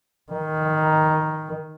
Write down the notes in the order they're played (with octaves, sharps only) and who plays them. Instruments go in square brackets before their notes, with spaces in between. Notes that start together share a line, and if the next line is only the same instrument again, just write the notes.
[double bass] D#3